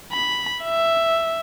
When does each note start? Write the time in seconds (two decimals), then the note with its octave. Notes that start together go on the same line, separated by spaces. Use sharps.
0.12 B5
0.64 E5